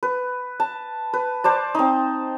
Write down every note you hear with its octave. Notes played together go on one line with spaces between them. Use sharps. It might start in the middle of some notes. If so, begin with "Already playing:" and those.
B4
A5
B4
C5 D5 A5
C4 D#4